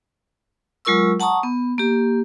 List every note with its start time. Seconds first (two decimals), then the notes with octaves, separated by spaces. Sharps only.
0.85 F#3 G#3 F4 A#4 C#6 E6
1.20 F#5 A5 A#5 C#6 D#6
1.43 B3
1.78 A#3 G4